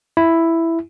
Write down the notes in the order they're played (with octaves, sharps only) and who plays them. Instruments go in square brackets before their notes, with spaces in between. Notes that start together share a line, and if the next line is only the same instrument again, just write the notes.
[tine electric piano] E4